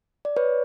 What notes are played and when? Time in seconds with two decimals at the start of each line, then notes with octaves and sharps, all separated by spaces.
0.25 D5
0.37 B4 C#5